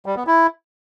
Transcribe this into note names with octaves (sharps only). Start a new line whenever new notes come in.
G3
B3
E4